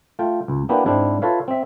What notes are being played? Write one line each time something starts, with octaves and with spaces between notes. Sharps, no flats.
A3 F4 G5
C#2
A#3 B3 D4 E4 F#4 G4
G#2 C4 D4 E4
F4 A4 B4 C#5 E5 F5
C4 E5